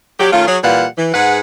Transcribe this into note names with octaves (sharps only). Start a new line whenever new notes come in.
F#3 G4
D#3 A3 C#4 F4
F#3 G#4 C#5
A#2 E3 G3 B4 F5 F#5
E3
G#2 G#4 B4 F#5